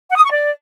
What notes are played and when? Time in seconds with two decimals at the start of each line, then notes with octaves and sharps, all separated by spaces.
0.09 F#5
0.16 D#6
0.23 C#6
0.31 D5